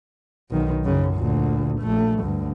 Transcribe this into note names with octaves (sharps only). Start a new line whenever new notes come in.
B1 D#3
F#2 C#3
D2 A#2
A#1 A3
D2 G2